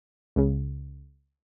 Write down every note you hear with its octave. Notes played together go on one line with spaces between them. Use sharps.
C#2 C#3